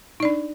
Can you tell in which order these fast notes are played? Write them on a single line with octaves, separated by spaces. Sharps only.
D#4 D5 D4